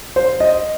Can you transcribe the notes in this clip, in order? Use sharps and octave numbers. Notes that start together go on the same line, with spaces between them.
C5
D#5